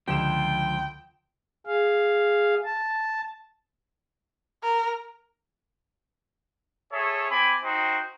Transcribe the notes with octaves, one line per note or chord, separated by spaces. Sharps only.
C#2 D3 F3 G5 E7
G#4 F5
A5
A#4
G#4 A4 C#5 E5 C#6
C4 G#5 B5 D6
D#4 F#4 C5 G5